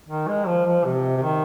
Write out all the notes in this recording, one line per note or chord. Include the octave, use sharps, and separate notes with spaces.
D#3
G#3
F3
F3
C3
C3
D#3